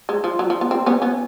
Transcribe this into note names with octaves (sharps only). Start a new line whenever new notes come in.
G#3
F3
F#3
F3
B3
C4
B3 C#4
B3 C#4